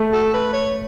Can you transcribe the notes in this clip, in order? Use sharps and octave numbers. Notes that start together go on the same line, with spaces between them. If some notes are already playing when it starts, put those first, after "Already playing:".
Already playing: A3
F#4 A4
B4
C#5